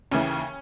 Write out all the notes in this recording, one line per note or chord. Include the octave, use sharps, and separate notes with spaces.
D#2 C#3 E3 C#4